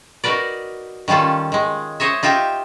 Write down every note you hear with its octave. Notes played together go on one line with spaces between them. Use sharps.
D#4 F#4 A#4 B4 D5
D#3 G3 C#4 F4 A4
D#3 G#3
C5 C#5 D#5 E5
D#4 F4 G4 E5 G5